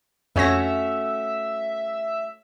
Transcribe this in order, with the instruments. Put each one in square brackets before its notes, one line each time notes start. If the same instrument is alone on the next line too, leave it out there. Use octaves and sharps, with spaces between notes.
[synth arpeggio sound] F2 C#5 A#6 [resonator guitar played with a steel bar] A3 C#4 F#4 [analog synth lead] E5